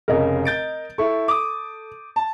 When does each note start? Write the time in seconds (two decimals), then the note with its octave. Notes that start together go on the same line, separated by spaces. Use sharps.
0.08 F1 C#3 A#4 D#5
0.45 G6 A6 D7
0.98 E4 A4 C#6
1.28 D6 D#6
2.16 A5